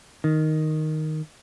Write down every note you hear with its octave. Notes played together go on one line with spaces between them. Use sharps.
D#3